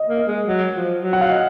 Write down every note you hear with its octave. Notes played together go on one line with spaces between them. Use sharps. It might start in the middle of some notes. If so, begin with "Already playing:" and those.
Already playing: D#5
A#3
D#5
G#3
F#3
F3
F#3
F#5
F5
D#5